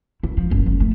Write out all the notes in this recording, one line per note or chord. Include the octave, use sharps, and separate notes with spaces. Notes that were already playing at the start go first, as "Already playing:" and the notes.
E4
F3
F#1
F#1
A3